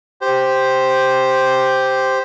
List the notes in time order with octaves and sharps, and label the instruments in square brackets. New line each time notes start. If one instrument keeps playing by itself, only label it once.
[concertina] G4 C5